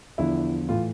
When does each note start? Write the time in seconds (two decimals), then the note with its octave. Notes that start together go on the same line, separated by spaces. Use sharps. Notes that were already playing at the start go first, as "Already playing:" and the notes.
0.18 E2 D3 F3 E4
0.69 A2 E3 F4